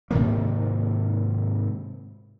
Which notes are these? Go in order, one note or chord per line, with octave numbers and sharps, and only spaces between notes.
G#2 C3 D#3 A#3